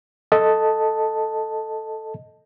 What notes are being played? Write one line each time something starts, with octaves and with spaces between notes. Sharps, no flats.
A4 D#5 A5